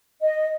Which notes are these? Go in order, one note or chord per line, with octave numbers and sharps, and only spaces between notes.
D#5